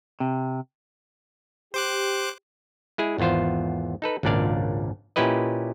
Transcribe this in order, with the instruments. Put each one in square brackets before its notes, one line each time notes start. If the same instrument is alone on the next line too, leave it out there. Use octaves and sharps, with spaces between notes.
[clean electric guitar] C3
[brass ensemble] G4 [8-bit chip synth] C5 D6 F#6
[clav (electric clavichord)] G#3 E4 G#4
G#1 E2 B3 F4 C5
D#4 A4 B4
G#1 C#2 A#2 D4 D5 F5
A#2 C#4 E4 G4 B4 D#5